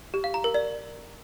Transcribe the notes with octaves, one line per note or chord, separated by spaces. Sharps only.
G4
F5
A#5
A#4
D5